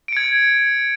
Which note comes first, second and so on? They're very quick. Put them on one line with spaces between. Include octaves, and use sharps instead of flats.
D7 C#7 G#6